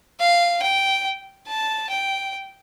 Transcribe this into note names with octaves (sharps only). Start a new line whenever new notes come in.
F5
G5
A5
G5